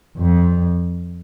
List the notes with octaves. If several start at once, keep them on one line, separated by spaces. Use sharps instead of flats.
F2